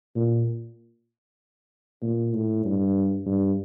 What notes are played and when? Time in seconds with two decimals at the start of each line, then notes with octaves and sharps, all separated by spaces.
0.16 A#2
2.02 A#2
2.33 A2
2.65 G2
3.26 G2